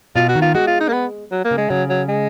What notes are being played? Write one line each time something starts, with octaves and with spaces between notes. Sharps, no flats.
B2 F4
F#4
D#3
F4
G#3 F#4
F4
D#4
A#3
B3
F#3
A#3
C#3
G#3
C#3 F#3
F#3
G#3